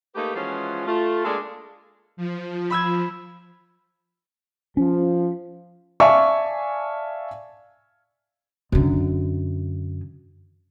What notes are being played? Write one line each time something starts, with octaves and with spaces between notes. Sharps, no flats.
A3 A#3 D#4 G4 B4
E3 F3 G#3 C#4 F4 F#4
A3 F4
G#3 A#3 D4 F4 G#4 A4
F3
B5 E6 G#6
F3 C#4
D5 E5 F5 G#5 A5 C#6
F#2 D3